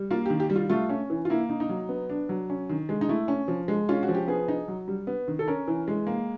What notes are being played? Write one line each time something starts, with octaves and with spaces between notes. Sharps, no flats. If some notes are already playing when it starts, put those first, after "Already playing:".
Already playing: G3
A#3 F4
G4
D#3
G4
G3
F4
A3 F4
C#4
E3
F4
A#3 E4
D#4
D#4
F#3
B3
D4
F#3
C#4
D#3
G#3
D#4
A3 E4
C#4
F3
G#3
C#4 F4
F#4
F3
G4
B3 G#4
D#4
F#3
G3
B3
D#3
A4
C#4 A#4
E3
G#3
A#3